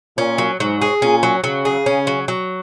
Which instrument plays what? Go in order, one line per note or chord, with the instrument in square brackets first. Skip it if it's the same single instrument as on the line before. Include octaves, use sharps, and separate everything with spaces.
[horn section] A#2 [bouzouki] C#4
[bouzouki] F#3
[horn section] G#2 [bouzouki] F#3
[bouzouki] G#4
[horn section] A#2 [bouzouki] C#4
[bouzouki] F#3
[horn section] C#3 [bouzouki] F#3
[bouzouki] G#4
C#4
F#3
F#3